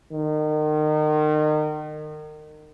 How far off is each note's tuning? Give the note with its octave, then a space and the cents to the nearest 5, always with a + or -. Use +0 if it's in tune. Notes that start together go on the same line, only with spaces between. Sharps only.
D#3 -30